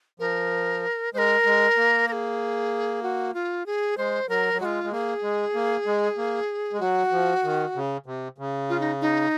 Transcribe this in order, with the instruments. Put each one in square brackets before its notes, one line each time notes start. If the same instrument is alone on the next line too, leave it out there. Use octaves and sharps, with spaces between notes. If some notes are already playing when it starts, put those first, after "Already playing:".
[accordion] F3 [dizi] A#4
[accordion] G#3 [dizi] A#4 C5
[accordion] G#3
A#3
[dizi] A#4
G#4
F#4
F4
G#4
[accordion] G#3 [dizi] C5
[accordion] F#3 [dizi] A#4
[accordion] F#3
[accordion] G#3 [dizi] F4 F#4
[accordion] G#3
[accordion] A#3 [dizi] G#4
[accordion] G#3
A#3
G#3
A#3
G#3
[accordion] F#3 [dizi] F#4
[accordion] F3
D#3
C#3
C3
C#3
[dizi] F4
D#4
D#4